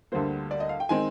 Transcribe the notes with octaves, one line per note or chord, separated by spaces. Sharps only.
D2 D3 G3 A#3 C5
D5
D#5
F5
G5
D#3 G#3 C4 G#5